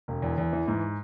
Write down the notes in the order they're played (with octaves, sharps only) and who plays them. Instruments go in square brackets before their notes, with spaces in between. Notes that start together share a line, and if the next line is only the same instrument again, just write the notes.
[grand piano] E1
E2
E2
E3
G#2